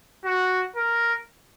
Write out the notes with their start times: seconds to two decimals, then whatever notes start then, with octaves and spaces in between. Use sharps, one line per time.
0.25 F#4
0.76 A#4